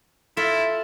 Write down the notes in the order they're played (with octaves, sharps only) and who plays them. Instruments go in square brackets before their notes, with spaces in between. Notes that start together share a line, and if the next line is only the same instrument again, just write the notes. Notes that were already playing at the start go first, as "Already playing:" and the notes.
[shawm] E4 [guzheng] F4 A4 E5